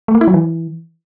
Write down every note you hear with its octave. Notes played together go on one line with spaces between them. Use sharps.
A3
A#3
E4
F#3
E3